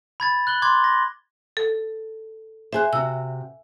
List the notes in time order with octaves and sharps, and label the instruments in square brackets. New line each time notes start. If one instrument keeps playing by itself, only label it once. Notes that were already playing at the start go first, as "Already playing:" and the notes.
[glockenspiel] B5 G#6 A6
F#6 F#7 G7
C6 D6 G#6
A#6
[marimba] A4
[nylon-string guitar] G#4 C5 [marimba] E5 G#5 F#6
[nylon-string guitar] C3 F#4 [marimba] E6